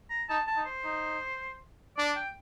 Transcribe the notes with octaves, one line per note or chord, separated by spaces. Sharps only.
A#5
D#4 A5
A5
D#4
C5
D#4
D4 D5
G5